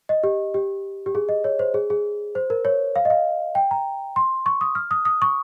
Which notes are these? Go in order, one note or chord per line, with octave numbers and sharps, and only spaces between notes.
D#5
G4
G4
G4
G#4
D#5
C#5
C5
G#4
G#4
C5
A#4
C#5
F5
D#5
F5
G5
A#5
C6
C#6
D#6
F6
D#6
D#6
C#6